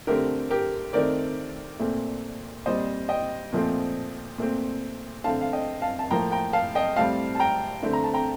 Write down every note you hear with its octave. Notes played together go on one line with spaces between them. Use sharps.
D3 A3 C4 G4 A#4
G4 A#4
D#3 A3 C4 A#4 D5
A#2 A3 C4
A#2 G3 C4 C5 D#5
D#5 G5
A#2 F3 A3 C4
A#2 A3 C4
D3 A3 C4 F5 A5
F5
D#5 G5
F5 A5
A5
A2 F3 A#3 G5 A#5
G5 A#5
F5 A5
D#5 G5
A2 G3 C4 F5 A5
A5
G5 A#5
D3 A3 C4
A#5
A5
G5 A#5